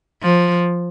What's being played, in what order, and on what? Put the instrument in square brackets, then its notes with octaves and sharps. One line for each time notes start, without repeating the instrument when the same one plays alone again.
[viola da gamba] F3